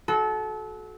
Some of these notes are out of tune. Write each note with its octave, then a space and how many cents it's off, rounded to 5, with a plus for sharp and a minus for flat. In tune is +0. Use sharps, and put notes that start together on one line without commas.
F#4 +0 A4 -30